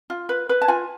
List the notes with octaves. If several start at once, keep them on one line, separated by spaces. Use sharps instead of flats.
F4
B4
B4
A5
F4 G#5